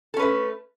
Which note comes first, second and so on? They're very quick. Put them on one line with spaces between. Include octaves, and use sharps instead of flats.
A4 C#4 B4 A3